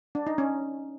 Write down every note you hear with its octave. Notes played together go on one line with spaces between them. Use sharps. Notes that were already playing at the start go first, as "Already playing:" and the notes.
D4
D#4
C#4